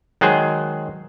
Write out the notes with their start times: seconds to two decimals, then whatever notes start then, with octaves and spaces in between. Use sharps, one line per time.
0.21 D#3 F#3 G#3 G#4 C5